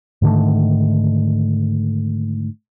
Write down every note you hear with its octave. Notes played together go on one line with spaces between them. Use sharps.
G#2 D3 D#3 A3